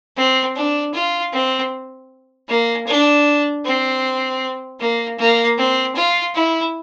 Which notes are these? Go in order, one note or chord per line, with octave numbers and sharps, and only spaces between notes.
C4
D4
F4
C4
A#3
D4
C4
A#3
A#3
C4
F4
E4